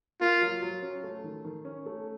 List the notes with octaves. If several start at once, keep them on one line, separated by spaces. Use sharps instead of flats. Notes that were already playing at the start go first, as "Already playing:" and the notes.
A#3 F4
F#3
F#3
C#4
A3
D#3
D#3
C#4
A3